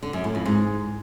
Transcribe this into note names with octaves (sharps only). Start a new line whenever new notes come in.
D3
F#2
A2
F2
G#2